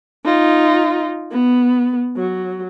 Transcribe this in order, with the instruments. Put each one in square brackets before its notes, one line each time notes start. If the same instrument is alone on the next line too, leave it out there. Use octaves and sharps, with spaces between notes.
[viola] D#4 F4
B3
F#3